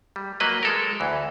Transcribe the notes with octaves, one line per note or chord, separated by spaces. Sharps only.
G3
F#3 A#3 B4 D#5
G#3 A4 A#4
D2 E3